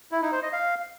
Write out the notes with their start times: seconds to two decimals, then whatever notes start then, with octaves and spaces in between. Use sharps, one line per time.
0.12 E4
0.22 D#4
0.32 C5
0.42 D#5
0.53 F5